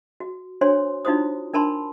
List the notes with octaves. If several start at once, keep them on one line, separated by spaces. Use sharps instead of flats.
F#4
D4 F#4 C5 C#5 G#5 C6
D4 D#4 F4 F#4 C5 D#6
D4 A#4 A5 B5 C6